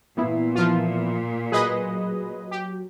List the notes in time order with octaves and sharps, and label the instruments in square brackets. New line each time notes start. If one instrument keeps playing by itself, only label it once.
[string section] A#2 [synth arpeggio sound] E3 B3 E4
[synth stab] F3 F4
[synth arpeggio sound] F#3 [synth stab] G#4 B4 D#5
[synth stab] G4